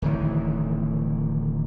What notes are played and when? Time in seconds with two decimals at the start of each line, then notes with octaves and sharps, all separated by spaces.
0.02 D1 D#3 E3